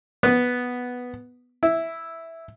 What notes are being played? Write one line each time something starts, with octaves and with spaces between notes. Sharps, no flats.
B3
E4